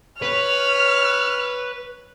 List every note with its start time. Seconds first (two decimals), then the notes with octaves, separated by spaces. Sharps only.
0.22 B4 C#5 F6